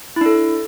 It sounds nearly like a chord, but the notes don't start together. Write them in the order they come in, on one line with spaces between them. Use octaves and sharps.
E4 D4 A4